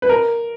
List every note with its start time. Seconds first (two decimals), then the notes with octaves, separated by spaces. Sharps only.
0.02 B4
0.09 A#4